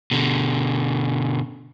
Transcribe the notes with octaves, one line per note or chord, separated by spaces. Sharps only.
B2 D3